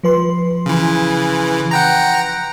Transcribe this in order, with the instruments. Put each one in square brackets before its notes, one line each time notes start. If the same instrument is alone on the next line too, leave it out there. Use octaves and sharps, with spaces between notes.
[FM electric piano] F3 B4 C6
[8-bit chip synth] C#3 E3
F#5 G5 A#5